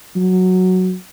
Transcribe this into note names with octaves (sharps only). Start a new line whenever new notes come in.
F#3